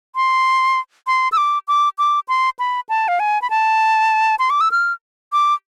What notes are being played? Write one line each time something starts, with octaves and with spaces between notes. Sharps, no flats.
C6
C6
E6
D6
D6
D6
C6
B5
A5
F5
G#5
B5
A5
C6
D6
E6
F6
D6